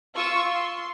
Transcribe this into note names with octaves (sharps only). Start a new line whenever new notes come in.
F4 C#6 E6
C6